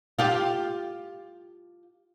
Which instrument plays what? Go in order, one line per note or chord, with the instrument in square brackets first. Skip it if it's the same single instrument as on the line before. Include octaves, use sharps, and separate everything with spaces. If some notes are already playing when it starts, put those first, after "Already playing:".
[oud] F4 G4